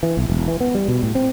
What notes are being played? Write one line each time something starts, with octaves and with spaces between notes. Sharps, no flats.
E3
B1
E1
E3
B3
G3
B2
A2
C4